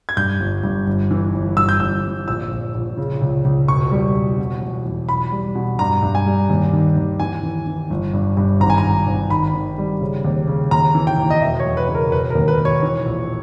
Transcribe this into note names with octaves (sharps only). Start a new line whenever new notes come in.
G#6
G2 G6
G1
G2
G1
E3
G1
G2 E6
G6
G1 E6
G1
A#1 E6
A#1
A#1
C#3
C#2
C#2
E1 C#6
G3
E1
B2
E2
E2
B1 B5
G3
B2
G2 A#5
G2
G#5
G3
D#2
D#3
D#2
E3 G#5
E3
E3
G1
G2
G2
G#1 A#5
G#5
A#5
G#1
G#1
D#3 B5
D#3
G3
C#3
D#2
C#3
D#2 A#5
E3
G5
D#2
D#5
E1 E5
C#5
E2
B4
C#3
A#4
E1 B4
A#4
D#2
B4
E1
C#5
E3
A#1